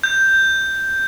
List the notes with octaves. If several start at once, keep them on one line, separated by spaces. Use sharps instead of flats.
G6